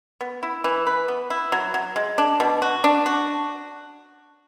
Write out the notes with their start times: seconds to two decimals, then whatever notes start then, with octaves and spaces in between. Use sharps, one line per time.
0.21 B3
0.43 E4
0.64 E3
0.87 B4
1.08 B3
1.30 E4
1.52 F#3
1.74 F#3
1.96 G#3
2.18 D4
2.40 B2
2.62 F#4
2.84 D4
3.06 F#4